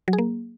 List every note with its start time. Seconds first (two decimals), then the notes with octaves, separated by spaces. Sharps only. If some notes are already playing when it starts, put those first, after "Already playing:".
0.08 F#3
0.13 G#4
0.18 A#3